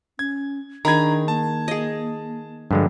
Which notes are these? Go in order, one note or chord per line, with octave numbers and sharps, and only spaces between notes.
C#4 G#6
D#3 D4 G#4 A#5 B5 G#6
A#3 A5
G#4 D#5
G2 D3 F3 G#3